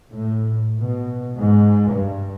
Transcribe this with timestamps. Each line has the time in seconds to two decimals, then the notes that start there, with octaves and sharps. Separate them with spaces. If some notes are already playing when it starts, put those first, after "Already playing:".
0.12 A2
0.80 B2
1.37 G#2
1.90 G2